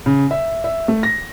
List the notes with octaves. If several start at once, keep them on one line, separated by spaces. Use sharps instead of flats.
C#3
E5
E5
A3
A#6